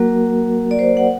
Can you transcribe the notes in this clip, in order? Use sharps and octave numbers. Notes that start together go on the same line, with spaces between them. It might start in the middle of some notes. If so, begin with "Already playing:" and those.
Already playing: F#3 A#3 F#4 A#4
D5
C5
F#5